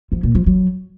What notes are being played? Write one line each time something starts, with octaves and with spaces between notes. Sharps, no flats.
F3
A#2
F3
F#3